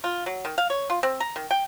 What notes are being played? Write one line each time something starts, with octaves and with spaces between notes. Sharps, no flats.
F4
F#3
D#3
F5
C#5
F4
C4
A#5
D#3
G5